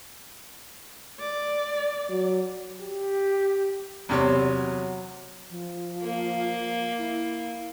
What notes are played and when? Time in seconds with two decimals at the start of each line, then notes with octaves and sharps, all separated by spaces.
1.20 D5
2.09 F#3
2.82 G4
4.09 E2 C3 F#3 C#5
5.50 F3
6.03 A#3
6.98 E4